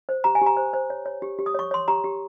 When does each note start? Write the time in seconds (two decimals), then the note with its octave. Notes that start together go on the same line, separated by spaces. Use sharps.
0.09 C5
0.24 G4 A#5
0.35 G#5
0.41 G4 A#5
0.57 C5
0.73 C5
0.90 C#5
1.06 C#5
1.22 G4
1.39 G4
1.46 D#6
1.54 C#5 C#6
1.71 C#5 C6
1.88 G4 A#5
2.04 G4